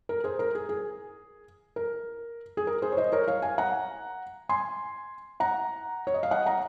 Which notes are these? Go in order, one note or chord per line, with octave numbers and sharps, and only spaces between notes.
A#4
G#4 C5
A#4
G#4
G#4
A#4
G#4
A#4
G#4 C5
C#5
C5 D#5
A#4 C#5
C#5 F5
F5 G#5
F#5 A#5
G#5 C6
F#5 A#5
C#5
D#5
F5
D#5 F#5
F#5 A#5